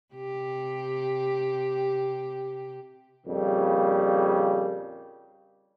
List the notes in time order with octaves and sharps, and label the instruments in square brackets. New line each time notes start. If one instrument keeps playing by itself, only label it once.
[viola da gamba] C3 G4
[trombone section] A#1 F2 C#3 G3 A#3